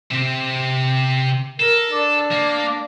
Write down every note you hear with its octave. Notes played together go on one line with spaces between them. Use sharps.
C3 C4
A4 A#4
D4
A#3